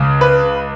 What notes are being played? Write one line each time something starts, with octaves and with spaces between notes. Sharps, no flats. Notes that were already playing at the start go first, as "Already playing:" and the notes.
Already playing: C#2 C#3
B4